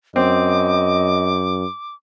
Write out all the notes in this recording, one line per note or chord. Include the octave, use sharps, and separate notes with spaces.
F#2 C4 D#5 D6